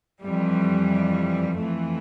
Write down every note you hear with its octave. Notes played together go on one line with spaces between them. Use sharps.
F2 E3 G3
F2 E3 A3